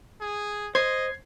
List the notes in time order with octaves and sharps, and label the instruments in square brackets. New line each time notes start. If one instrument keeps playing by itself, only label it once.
[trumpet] G#4
[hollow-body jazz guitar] C5 [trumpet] D#5 [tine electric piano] G#6 C7